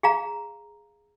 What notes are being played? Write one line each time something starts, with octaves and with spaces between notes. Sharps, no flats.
G#4 F5 A#5